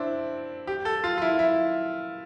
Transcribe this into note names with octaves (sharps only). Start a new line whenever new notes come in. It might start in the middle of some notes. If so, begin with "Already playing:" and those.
Already playing: C4 D4 E4
G4
A4
F4
F4
E4
E4